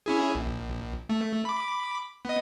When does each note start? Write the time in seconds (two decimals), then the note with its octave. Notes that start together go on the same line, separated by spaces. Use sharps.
0.06 C#4 E4 G#4
0.35 A#1
1.09 A3
1.45 B5 D6
2.25 B3 D#5